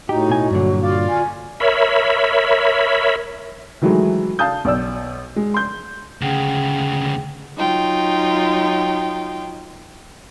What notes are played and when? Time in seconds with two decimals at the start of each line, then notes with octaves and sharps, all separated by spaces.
0.09 A2 D#4 F#4 G4
0.29 B2 G#5
0.51 G2 A#2 D3 F#3
0.83 F4 D5 F5
1.09 G#5
1.60 A#4 C#5 E5 B5
3.82 D#3 E3 F#3 G#3 A3
4.39 F5 A5 D#6 G6
4.65 B1 D5 E6
5.36 G#3
5.54 C6 G6
6.21 D2 C#3 G#4 F#5 G5
7.56 F#3 D#4 F4 G5